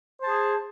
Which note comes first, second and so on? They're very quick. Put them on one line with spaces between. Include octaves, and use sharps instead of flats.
C5 A5 G#4